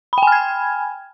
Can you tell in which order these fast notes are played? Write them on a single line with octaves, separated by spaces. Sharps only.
B5 G5 G#5 F6 G#6